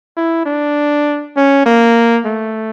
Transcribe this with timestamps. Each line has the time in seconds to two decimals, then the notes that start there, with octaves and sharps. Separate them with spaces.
0.17 E4
0.45 D4
1.36 C#4
1.66 A#3
2.26 A3